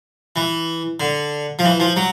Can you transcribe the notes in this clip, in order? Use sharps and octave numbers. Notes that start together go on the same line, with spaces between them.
E3
D3
F3
E3
F3
F#3